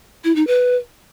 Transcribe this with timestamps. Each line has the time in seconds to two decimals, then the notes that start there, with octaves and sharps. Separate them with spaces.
0.24 E4
0.36 D#4
0.47 B4